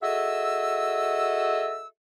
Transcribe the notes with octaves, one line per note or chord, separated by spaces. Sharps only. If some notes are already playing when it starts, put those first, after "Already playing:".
F#4 G#4 A4 D#5 E5 E6